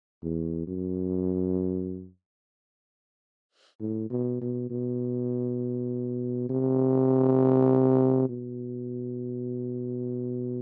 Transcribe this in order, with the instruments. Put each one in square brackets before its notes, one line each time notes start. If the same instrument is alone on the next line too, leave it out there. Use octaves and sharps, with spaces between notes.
[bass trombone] E2
F#2
A2
B2
B2
B2
C3
B2